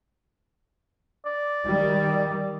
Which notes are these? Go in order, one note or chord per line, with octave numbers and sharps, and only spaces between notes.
D5
D#3 G3